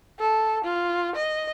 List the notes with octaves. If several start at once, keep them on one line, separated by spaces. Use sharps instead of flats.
A4
F4
D#5